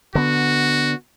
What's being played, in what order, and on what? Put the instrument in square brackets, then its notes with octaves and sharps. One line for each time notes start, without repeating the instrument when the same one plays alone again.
[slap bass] D3 B3 [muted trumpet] F#4